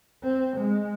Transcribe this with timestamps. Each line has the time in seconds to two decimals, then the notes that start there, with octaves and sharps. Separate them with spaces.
0.23 C4
0.57 G#3